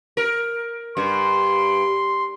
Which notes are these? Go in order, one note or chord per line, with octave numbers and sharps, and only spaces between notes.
A#4
G2 C6